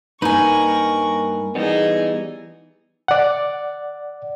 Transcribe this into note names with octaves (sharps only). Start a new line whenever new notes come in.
G2 A#3 D#4 A#4 B4 G#5 C#6
E3 G3 B3 D#4 G#4
D5 F#5